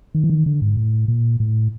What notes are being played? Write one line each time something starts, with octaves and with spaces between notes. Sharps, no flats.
D#3
E3
D#3
D3
G#2
A2
A#2
A2